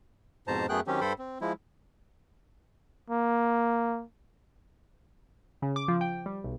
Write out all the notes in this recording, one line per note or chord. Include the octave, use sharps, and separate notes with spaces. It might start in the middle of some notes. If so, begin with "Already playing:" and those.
F2 G#2 B2 C5 A5 A#5
F#2 A3 B3 G#4 G5 F#6
D#3 F#3 C4 C#4 G4
G2 A4 C5 G5 B5
C4
F3 G#3 E4
A#3
C#3
D6
F3
G5
G3
B1